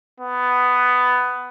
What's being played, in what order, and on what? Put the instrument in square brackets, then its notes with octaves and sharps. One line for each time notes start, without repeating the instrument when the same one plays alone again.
[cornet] B3